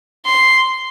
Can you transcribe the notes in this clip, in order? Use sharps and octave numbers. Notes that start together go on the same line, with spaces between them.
C6